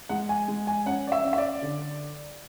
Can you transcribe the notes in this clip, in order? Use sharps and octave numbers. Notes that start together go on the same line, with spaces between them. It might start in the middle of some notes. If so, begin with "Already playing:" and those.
G#3 F#5
G#5
G#3
G#5
C#4 F#5
D5
E5
C#4
E5
D5
D3